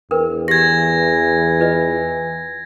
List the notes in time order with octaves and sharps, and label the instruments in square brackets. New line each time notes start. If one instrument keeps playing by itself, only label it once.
[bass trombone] E2 [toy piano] D4 A#4 B4
[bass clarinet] E3 [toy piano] G4 [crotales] G#6 A#6
[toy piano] F4 B4 D#5